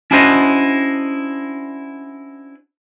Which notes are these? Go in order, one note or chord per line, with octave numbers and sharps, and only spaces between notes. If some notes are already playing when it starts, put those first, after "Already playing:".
C#4 D4 E4 F#4 C5 D#5